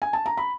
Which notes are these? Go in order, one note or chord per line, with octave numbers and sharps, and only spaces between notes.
G#5
A5
A#5
B5